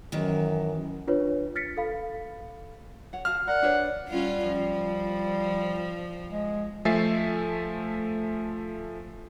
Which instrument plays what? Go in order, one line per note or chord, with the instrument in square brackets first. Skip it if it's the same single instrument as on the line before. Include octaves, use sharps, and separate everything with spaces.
[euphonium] F#2 [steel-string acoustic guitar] D#3 E3
[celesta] D4 F4 B4 C#5
F6 A6 B6 C#7
A4 F5 B5
[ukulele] C#5 F#5
[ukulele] F#4 F5 A5 [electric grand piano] F6
[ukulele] A#4 [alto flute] D5 [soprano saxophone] F#5
[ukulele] D4 B4 C#5
[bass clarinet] G3 [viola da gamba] C#4 F4
[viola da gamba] F3
[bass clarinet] G#3
[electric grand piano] F3 A3 E5 G#5 A6 C7